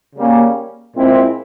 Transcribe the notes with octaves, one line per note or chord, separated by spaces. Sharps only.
C#3 G3 A#3 C#4
A#2 G#3 C4 E4